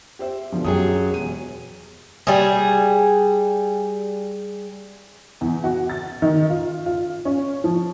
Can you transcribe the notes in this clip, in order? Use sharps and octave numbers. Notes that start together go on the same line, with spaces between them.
G4 C5 E5
B2 D3 F3
F#2 F#3 G4 G#4 D#6
E1 D#7
G3 G#4
E2
F#4
A6
D#3
F4
F4
C#4
F3